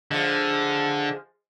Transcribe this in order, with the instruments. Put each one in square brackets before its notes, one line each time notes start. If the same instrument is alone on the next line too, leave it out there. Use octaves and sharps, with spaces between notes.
[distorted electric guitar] D3 [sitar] F3 G#3